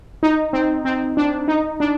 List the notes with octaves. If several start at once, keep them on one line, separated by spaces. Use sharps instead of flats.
D#4
C4
C4
D4
D#4
D4